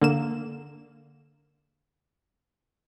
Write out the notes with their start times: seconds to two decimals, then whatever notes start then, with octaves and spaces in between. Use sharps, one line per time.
0.01 D3 A#3 E7